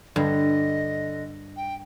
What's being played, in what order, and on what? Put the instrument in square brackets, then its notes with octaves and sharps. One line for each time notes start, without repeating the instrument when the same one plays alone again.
[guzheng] G2 [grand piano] D3 [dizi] D#5
[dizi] G5